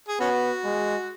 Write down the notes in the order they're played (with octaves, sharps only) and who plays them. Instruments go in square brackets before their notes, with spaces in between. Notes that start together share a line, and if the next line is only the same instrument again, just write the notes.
[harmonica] G#4
[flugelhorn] B3 [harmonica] C#4 F#4
[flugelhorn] G#3